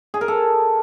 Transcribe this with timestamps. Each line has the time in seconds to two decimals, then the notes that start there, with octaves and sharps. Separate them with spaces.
0.14 G#4
0.21 A#4
0.28 A4